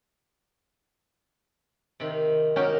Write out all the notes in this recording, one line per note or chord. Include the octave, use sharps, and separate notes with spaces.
C3 D#3
C#4 D#4 F#4 G4 A#4 G5